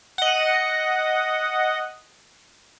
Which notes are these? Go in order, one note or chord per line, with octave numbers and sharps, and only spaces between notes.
D#5 F#5